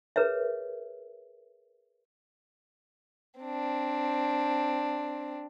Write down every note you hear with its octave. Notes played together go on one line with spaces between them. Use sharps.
G#4 A#4 B4 C#5 E5
C4 D4